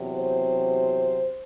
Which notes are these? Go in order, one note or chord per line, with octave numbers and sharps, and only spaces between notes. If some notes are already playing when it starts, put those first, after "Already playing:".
Already playing: E2 C3 F#3
C5